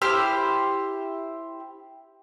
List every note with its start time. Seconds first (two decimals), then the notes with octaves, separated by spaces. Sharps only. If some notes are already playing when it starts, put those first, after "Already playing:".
0.02 E4 G4 C5 F6